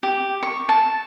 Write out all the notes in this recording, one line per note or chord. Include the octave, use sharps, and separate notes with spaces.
G4
C#6
A5